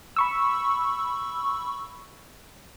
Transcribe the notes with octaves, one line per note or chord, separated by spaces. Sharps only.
B5 C#6 E6